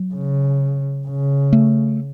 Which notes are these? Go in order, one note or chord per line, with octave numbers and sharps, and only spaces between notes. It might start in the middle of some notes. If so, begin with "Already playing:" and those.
Already playing: F#3
C#3
C#3
A3